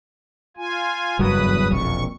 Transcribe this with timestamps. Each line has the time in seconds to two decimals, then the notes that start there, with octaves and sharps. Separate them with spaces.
0.57 F4 G#5
1.19 F#1 E2 G2 F#3 B4 D#6
1.71 E1 A#1 F2 C#6